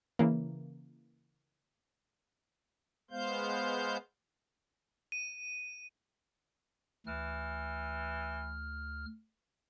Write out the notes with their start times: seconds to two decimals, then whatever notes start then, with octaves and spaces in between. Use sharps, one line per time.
0.19 C#3 E3 A#3
3.11 G#3 B3 C5 F5 G6
5.12 D#7
7.07 D2 E3 F6